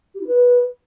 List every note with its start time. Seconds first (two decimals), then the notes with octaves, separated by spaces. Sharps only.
0.14 G4
0.20 E4
0.27 B4